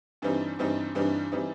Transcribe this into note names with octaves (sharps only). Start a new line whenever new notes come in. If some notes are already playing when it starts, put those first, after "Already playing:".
G2 E3 G3 C4 D#4
G2 E3 G3 C4 D#4
G2 E3 G3 C4 D#4
E3 G3 C4 D#4